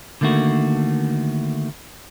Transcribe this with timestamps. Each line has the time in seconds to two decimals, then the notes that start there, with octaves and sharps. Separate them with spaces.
0.21 D3 D#3 A3 A#3 F#4